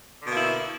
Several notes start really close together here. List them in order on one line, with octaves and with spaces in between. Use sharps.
D3 B2 A#3 E4